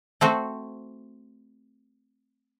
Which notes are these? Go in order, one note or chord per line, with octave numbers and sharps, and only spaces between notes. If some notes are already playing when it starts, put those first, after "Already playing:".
A3 C4 F#4